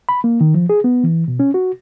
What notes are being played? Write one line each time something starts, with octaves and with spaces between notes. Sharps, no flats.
B5
A#3
D#3
F3
G#4
B3
E3
B2
C#4
F#4